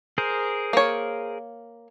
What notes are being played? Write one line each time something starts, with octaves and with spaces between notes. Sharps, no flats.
G#4 A#4 C5
A#3 C#5